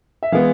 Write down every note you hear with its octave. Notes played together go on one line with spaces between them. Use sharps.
E5
E3 G#3 B3 F5